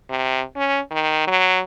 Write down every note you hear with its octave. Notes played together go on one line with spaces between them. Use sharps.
C3
C#4
D#3
F#3